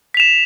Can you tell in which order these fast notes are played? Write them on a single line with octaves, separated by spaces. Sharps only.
B6 F7 E7